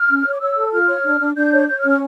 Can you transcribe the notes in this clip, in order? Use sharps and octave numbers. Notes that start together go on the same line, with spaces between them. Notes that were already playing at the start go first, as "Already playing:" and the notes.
Already playing: F6
C#4
C#5
D6
C#5 E6
A4
F4 F6
C#5
D4
D4
D4 G6
C#5
C#5 G6
F6
C#4
F6